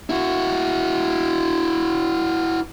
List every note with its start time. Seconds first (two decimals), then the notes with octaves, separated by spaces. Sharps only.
0.10 E4 F#4